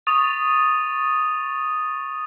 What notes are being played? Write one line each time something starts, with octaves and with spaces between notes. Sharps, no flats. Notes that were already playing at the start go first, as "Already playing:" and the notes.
C#6 D#6 A6 F7